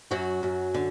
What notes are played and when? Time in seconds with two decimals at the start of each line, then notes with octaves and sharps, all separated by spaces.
0.11 F#2 F#3 F#4
0.43 F#2
0.74 D3